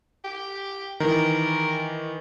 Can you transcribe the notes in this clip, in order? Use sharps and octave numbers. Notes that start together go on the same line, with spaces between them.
G4
D#3 E3 A#4